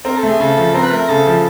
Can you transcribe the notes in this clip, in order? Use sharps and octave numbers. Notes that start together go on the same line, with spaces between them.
C4 A#4
A4
A3 G#4
C#3 A4
F3
C4 A#4
B4
A3 A#4
C#3 A4
F3